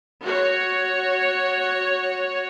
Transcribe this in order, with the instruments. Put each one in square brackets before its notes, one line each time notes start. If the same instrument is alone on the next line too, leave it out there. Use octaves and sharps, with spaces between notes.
[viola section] F#4 C#5